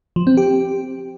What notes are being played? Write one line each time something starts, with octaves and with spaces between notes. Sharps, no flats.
F3
C4
G4